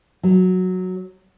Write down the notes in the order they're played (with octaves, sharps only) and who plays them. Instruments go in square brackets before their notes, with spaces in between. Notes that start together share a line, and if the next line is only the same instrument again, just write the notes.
[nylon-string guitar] F#3